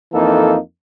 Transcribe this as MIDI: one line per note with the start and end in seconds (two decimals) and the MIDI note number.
0.13 0.57 41
0.13 0.57 52
0.13 0.57 58
0.13 0.57 63
0.13 0.57 69